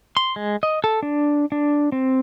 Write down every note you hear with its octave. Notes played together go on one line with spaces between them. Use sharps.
C6
G#3
D#5
A4
D4
D4
C4